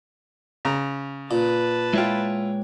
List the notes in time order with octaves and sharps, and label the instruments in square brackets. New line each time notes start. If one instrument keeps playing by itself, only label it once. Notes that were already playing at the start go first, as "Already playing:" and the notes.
[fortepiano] C#3 A#5
[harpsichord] A#2 [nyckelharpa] B4 A5
[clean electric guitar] G#3 C#5 G5 [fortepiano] E4 F4